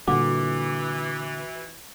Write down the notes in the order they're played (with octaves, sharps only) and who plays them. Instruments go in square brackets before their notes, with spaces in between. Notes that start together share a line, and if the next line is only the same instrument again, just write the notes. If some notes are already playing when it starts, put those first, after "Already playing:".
[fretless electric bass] A#2 D3 G3 [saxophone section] E3 [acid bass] F#4 [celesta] D6